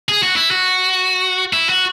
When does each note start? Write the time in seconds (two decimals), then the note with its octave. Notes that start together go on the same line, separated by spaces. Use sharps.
0.09 G#4
0.23 F#4
0.36 E4
0.51 F#4
1.53 E4
1.69 F#4